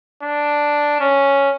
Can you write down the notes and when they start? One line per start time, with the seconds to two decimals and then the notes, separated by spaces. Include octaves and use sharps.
0.23 D4
1.00 C#4